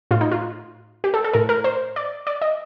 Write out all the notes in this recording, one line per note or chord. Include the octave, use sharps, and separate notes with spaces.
A2 F4
D#4
F4
G4
A4
A4
A2 A#4
A#4
C5
D5
D5
D#5